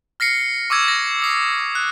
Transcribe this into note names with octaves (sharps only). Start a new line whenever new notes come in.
F6 A#6 C7 C#7
C#6 D6 E6 G#6
A#6
D#6 C7
F#6